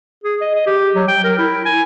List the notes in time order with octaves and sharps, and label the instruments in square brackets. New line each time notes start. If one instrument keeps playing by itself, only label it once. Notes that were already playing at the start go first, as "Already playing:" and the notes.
[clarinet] G#4
D#5
D#5
G4
F#3
G5
A#4
E4
G#5